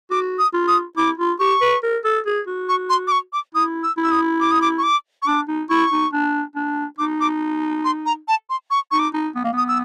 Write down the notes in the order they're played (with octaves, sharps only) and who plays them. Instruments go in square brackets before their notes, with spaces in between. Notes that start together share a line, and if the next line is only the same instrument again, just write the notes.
[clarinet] F#4 [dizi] D6
[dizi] D#6
[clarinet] F4
[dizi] D#6
[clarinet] E4 [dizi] D6
[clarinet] F4
[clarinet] G4 [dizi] C#6
[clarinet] B4
A#4
A4
G#4
F#4
[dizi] C#6
C6
D6
C#6
D6
[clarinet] E4 [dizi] D#6
[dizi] E6
[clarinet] E4
[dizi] E6
D#6
D6
D#6
D6
C#6
D6
C#6
[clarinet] D4 [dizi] D6
[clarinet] D#4
[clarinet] E4 [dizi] C#6
[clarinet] D#4
D4
D4
[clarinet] D#4 [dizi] D6
[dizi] D6
C6
A#5
A5
C6
C#6
[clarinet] D#4 [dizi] C#6
[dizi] D6
[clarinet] D#4
B3
A#3
[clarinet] B3 [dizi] D#6
[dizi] E6